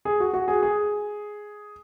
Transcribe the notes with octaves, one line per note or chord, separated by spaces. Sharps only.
G#4
F#4
F#4
G#4
G#4